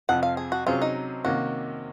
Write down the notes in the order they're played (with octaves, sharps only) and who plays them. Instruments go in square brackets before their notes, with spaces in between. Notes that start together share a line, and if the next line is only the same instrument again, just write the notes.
[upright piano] F2 C3 F3 C4 [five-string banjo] F#5
[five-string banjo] F5
G#4
F#4
[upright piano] C3 F#3 C#4 G#4 C5 [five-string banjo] F4
[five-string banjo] D#4
[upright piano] C3 D#3 A#3 C#4 [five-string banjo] F#4